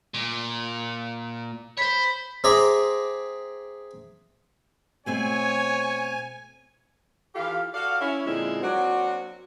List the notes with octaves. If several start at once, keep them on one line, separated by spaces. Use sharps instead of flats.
A#2
C5 C#5 B5
C4 G#4 E5 A#5 D6
B2 A3 C4 C#5 G#5
E3 F4 G4 A4 F5
F#4 A4 D5 F5
C#4 E4
A#2 D3 F3 G#3 C4 E4
F#3 A#3 C4 D4 F#4